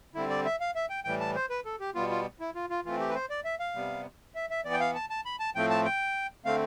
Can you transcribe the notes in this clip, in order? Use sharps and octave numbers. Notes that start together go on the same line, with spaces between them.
D3 G3 C4 E4
D5
E5
F5
E5
G5
A2 E3 G3 G5
A5
C5
B4
A4
G4
B2 G3 B3 F4
F4
E4
F4
F4
E3 A3 C4 F4
G4
B4
C5
D5
E5
F5
C3 G3 B3
E5
E5
E3 B3 D5
G5
F5
A5
A5
B5
A5
A2 F3 A3 C4 G5
A5
G5
D3 A3 C4 F5